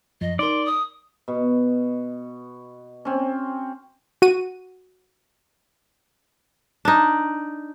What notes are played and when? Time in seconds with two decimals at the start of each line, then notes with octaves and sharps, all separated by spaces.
0.21 F#2 F3 D#5
0.39 D#4 A#4 D5 C6
0.65 D#6
1.28 B2
3.05 C4 C#4
4.22 F#4 D#7
6.85 D4 D#4